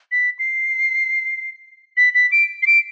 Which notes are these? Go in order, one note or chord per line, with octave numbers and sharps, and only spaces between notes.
B6
C7
B6
B6
D7
C7
D7